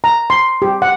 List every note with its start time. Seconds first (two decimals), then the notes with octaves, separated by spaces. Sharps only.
0.04 A#5
0.30 C6
0.62 G4
0.82 F#5